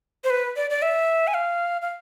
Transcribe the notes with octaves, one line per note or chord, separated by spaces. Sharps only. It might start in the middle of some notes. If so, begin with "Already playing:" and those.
C5
B4
D5
D5
E5
G#5
F5
F5